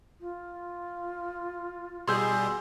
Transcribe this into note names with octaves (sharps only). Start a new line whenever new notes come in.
F4
B2 G3 G#4 D#5 C6 E6 G6